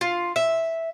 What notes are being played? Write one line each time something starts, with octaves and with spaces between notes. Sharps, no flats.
F4
E5